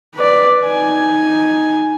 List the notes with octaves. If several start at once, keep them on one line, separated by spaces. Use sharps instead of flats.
B4 D5
D#4 G#5